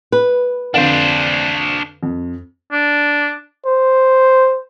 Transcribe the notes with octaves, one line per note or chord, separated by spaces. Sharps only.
B4
F2 D3 D4 C5 F5
F2
D4
C5